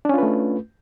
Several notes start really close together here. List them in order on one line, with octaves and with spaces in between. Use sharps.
D4 C#4 F4 B4 A3